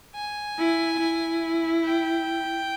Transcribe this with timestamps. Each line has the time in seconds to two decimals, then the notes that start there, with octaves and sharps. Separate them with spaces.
0.15 G#5
0.58 E4
0.99 E4
1.85 G5